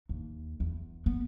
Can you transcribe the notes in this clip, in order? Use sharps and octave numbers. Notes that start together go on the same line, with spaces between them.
D#2
E2
B3